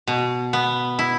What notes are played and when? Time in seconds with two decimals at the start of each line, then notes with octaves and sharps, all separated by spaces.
0.07 B2
0.53 B3
0.99 E4